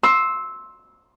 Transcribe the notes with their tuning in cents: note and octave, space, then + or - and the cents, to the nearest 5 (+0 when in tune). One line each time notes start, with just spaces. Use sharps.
C6 +15 E6 -10